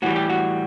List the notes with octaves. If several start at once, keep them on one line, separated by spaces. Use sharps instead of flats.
A2 E3 G3 F#4
G4
F#4